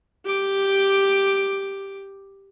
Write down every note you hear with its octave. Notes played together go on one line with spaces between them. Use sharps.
G4 D6